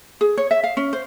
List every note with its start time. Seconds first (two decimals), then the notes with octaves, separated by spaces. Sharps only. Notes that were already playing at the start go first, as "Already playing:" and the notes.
0.21 G#4
0.38 C#5
0.51 E5
0.64 F5
0.77 C#4
0.93 C5